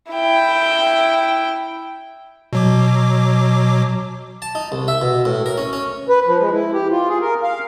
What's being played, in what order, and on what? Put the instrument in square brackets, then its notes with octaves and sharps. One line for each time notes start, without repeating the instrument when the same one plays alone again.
[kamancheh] E4 G5
[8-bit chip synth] B2 F#3 D6
[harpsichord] A5
D#4
C2
E5
B2
A2
A#4
C#4
C#4
[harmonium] B4
F3
G#3
E4
G4
F4
G#4
A#4
F5